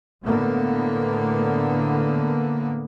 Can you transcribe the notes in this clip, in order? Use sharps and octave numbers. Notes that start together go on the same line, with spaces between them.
A2 D3 A#3 B3